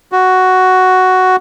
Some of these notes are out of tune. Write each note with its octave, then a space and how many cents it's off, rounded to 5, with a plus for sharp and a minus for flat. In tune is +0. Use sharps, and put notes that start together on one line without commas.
F#4 +5